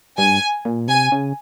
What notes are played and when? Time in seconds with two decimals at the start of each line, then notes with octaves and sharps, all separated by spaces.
0.18 G2 G#5
0.65 A#2
0.88 C3 G#5
1.12 C#3